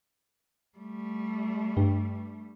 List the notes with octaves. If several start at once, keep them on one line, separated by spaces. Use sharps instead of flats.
G3 A3
G2